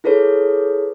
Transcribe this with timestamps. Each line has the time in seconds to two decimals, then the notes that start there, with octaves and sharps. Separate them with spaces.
0.04 E4 G#4 A4 B4 C#5